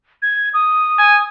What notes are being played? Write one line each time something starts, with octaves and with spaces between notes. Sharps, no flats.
G#6
D#6
G#5